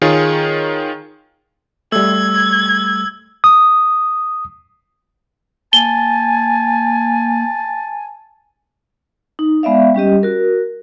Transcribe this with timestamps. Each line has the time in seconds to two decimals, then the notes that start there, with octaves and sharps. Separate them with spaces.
0.02 D#3 F4 G#4 C#5
1.92 G3 A3 E6 G#6
3.44 D#6
5.73 A#3 G#5 A5 G7
9.39 D#4
9.63 G#3 B3 D5 E5 F5
9.94 G3 C#4 G4 D#5
10.23 F#4 A#4